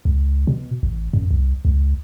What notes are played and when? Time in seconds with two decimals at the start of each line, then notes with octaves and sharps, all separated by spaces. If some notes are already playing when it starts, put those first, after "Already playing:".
0.05 C#2
0.47 B2
0.83 A1
1.13 F#2
1.31 C2
1.65 C#2